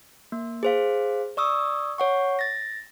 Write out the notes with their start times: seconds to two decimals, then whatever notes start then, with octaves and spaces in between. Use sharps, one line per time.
0.32 A#3
0.63 G#4 C5 F5
1.37 D5 C#6 D#6 E6
1.98 C#5 F#5 C#6
2.39 A6 A#6